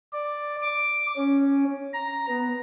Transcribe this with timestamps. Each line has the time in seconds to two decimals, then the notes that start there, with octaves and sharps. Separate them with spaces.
0.13 D5
0.62 D6
1.16 C#4
1.94 A#5
2.29 B3